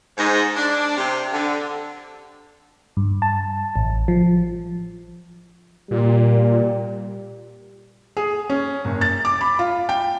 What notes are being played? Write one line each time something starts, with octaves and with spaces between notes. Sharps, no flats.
G#2
D4
C3
D3
G2
A5
A1
F3
A#2 G3
G#4
C#4
F#1
A6
D6
B5
F4
G5